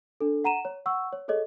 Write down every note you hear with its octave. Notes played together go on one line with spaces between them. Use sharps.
D4 A4
F#5 A#5 D#7 E7
C#5
F#5 C#6 E6
C#5
G#4 A4 C#5 D#5